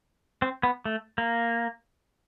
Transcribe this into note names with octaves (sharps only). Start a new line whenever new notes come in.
C4
B3
A3
A#3